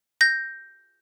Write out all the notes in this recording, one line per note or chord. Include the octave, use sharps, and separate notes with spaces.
G6 A#6